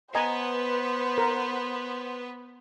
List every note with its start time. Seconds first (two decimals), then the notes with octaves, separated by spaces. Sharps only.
0.15 B3 B4 C5 D#5 G#5 A#5
1.18 A#4